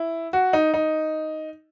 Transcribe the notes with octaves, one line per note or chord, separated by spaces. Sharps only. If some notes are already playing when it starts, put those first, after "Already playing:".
Already playing: E4
F#4
D#4
D#4